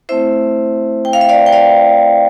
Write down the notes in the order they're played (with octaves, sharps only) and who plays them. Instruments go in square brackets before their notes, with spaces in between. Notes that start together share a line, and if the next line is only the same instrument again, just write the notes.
[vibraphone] A3 C4 E4 C5 E5
G5
F5
E5
D5 F5
G5
D5 F5